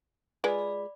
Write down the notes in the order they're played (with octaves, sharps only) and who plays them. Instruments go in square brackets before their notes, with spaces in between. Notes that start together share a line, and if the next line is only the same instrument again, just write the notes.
[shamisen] G#3 F4 B4 [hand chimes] D5 B5